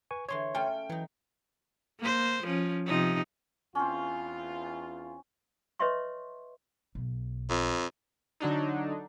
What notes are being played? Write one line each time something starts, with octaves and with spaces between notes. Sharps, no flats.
B4 G#5 C#6
D3 E3 G#4 C#5 C6
A3 C#4 F4 G5
E3 F#3 D#4
A#3 C5
F3 C#4
C3 F3 D#4
E2 C4 C#4 F4
B4 C#5 D#5 E5 C6 C#6
B1
F2
D3 F#3 D4 D#4